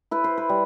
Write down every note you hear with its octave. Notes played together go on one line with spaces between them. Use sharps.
E4 B4
C5
B4
G3